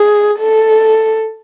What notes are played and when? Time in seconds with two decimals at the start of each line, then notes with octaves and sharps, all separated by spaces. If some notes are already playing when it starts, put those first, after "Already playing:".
Already playing: G#4
0.40 A4